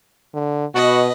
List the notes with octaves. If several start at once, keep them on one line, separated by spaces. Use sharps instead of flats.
D3
B2 F#4 B4 D#5